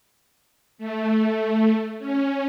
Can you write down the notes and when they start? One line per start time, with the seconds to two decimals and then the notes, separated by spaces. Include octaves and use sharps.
0.78 A3
1.99 C#4